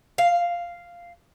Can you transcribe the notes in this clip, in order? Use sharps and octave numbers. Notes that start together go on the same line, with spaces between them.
F5